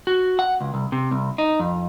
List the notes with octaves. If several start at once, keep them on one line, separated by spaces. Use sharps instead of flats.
F#4
F#5
C#2
C2
C3
C2
D#4
F2